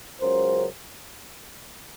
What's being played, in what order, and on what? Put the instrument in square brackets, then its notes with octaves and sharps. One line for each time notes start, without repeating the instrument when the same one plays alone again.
[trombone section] C#2 C#3 F#3 A#4 C5